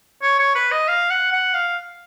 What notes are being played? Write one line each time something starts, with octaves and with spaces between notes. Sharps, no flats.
C#5
C#5
B4
D#5
F5
F#5
F#5
F5